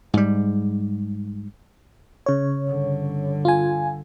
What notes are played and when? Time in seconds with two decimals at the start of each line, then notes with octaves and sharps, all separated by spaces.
0.13 G#2 G3
2.26 C#3 C#5
2.63 G1 D3
3.45 F4 G#5